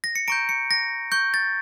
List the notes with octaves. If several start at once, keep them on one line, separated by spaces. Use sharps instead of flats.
A#6
C#7
A#5 C#6 G6 D7
C#7
A#6
C#6 G6
A6